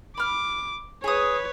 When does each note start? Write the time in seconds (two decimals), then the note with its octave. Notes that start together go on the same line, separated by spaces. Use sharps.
0.17 B5 D6 F6
1.04 G#4 B4 C#5 D#6